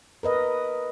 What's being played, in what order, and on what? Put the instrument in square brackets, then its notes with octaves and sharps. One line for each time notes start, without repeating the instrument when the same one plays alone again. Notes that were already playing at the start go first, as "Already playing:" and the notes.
[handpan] A#4 B4 D#5